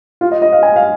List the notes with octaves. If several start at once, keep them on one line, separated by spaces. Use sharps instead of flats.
F4
D#5
D#5
F5
G#5
F5